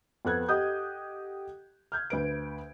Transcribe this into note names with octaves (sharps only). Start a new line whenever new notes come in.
F2 B3 A4 F#6 G#6
G4 A4 D#5 F#5 D#6 G6
F6 G6 G#6
D2 B4 D7